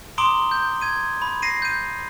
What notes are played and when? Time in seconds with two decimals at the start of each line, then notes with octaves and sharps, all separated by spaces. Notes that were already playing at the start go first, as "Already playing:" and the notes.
0.18 A#5 C6 D6 D#6 D7 G7
0.51 G6
0.81 G#6 D#7
1.22 B5
1.42 A#6 C7 D#7
1.62 G6 D#7